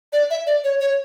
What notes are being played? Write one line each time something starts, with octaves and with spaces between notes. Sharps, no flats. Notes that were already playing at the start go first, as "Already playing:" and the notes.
D5
E5
D5
C#5
C#5